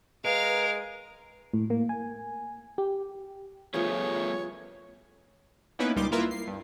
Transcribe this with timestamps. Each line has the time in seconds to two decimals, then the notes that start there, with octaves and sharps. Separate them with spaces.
0.25 G#3 A#4 B4 F5
1.54 A2
1.70 A#3
1.89 G#5
2.78 G4
3.74 F3 G3 A3 B3 G#4 C#5
5.79 A#3 B3 C#4 D#4 E4 B4
5.96 C#2 A#2 G3 D#4 C6 D6
6.12 A#3 E4 F4 A#4 B4 E5
6.31 C7
6.47 G2